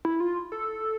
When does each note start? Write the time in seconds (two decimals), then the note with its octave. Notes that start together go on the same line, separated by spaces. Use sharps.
0.05 E4
0.20 F4
0.52 A4